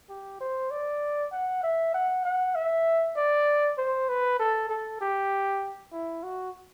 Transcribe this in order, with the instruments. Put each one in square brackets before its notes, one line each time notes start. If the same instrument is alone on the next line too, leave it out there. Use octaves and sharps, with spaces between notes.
[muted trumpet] G4
C5
D5
F#5
E5
F#5
F#5
E5
D5
C5
B4
A4
A4
G4
E4
F#4